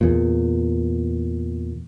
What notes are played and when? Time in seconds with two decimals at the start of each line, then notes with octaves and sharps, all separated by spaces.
0.01 E2 A#2